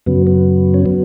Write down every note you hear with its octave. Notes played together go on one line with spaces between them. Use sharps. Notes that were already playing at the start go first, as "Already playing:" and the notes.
F#2 C#3 F#3 B3
B3
C#4
F#3 B3